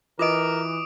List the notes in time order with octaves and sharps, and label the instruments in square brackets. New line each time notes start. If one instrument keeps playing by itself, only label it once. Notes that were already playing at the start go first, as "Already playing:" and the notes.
[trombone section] E3 [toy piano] F4 B4 D#5 [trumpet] A#4 [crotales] D6 D#6 D7